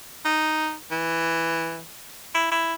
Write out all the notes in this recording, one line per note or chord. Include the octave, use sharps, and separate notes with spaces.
D#4
E3
E4
E4